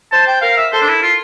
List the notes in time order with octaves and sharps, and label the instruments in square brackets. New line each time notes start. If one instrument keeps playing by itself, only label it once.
[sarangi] C5 [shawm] A5
[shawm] G5
[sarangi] A#4 [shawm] F5
[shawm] E5
[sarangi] A4 [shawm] C5
[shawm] D4
E4
F4